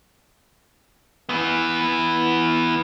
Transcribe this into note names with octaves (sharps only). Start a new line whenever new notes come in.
E3 B3